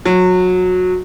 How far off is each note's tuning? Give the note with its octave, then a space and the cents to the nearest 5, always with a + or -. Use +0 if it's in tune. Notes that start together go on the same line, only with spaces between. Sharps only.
F#3 -20